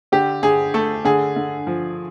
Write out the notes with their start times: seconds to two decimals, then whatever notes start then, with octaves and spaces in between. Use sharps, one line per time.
0.12 D3 G4
0.43 D3 G#4
0.74 A3 A4
1.05 D3 G#4
1.36 D3
1.67 F3